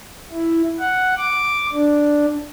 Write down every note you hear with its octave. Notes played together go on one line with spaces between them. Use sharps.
E4
F#5
D6
D4